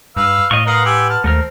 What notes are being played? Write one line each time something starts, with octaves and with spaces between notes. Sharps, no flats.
G2 B4 F5 E6
A2 D#5 F5 C#6
A#4 B4 F5 F#5 C6 D#6
G4 G#5 E6
A5 F6
D#2 A3 C4 A#4 F6